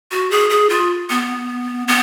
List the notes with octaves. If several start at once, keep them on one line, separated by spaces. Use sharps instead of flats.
F#4
G#4
G#4
F4
B3
B3